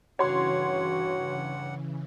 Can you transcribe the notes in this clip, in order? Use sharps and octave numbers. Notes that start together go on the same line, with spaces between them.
G2 C#3 E3 F#4 C#5 F#5 C6